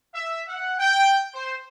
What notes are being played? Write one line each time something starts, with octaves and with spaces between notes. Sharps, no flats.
E5
F#5
G5
C5